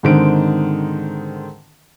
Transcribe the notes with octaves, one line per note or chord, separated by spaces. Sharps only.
G#2 D3 D#3 C4 D7